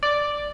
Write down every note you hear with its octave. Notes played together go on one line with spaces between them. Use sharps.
D5